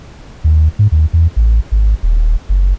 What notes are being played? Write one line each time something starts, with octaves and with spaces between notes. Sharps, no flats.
D#2
G#2
D#2
E2
A1
G#1
D#1
F#1